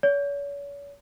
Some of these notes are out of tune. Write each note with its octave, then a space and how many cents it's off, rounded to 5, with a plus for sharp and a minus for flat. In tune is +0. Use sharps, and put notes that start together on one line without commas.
C#5 +40